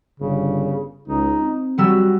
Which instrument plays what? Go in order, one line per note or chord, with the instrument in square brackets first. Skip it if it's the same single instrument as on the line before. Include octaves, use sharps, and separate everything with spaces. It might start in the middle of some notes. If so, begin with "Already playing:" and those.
[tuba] G1 [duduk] C#3
[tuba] C#2 [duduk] D#4
[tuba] C4
[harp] F#3 G3 E6 [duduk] F#4